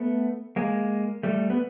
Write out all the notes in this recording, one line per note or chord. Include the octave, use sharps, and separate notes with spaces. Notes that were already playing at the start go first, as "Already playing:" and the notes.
Already playing: A3 B3
G#3 A#3
G3 A3
B3